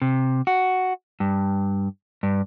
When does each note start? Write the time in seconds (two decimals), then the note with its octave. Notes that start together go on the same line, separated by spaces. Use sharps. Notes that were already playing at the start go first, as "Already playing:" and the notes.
0.02 C3
0.47 F#4
1.20 G2
2.23 G2